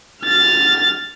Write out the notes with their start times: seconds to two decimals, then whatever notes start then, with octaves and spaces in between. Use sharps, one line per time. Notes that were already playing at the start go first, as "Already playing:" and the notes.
0.23 F6 A6